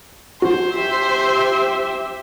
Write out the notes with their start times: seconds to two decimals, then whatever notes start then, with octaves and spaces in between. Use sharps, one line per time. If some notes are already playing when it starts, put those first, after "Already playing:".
0.42 F#4 C5
0.73 G4 E5